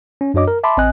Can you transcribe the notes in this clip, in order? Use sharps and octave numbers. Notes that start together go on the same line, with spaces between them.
C#4
F#2 D4 F#4 C#5 D#5 D6
A#4
E5 A5 B5 C6 D6
A1 C4 D#5 G#5 F#6